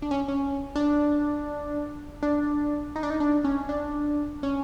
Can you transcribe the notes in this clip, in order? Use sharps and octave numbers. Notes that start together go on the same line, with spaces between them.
D4
C#4
C#4
D4
D4
D#4
D4
D#4
D4
C#4
D4
C#4